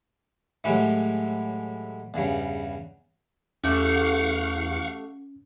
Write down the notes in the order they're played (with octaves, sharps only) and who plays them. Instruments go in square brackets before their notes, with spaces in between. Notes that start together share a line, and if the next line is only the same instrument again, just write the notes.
[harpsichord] A2 E3 F#3 G#3 G4
E2 G2 C#3
[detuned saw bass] E2 [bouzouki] A3 F#4 G4 [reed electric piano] C#4 [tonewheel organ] F5 F#5 C#6